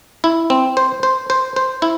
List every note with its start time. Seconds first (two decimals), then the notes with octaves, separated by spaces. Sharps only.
0.24 E4
0.50 C4
0.77 C5
1.03 C5
1.30 C5
1.56 C5
1.82 E4